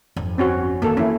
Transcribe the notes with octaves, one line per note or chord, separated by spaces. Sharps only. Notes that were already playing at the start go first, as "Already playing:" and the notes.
G1 F2
C4 C#4 F#4
D#3 A#3 D#4 A4
E3 C#4 E4